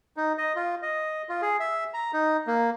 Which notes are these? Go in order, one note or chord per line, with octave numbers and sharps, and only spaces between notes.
D#4
D#5
F4
D#5
F4
G#4
E5
A#5
D#4
A#3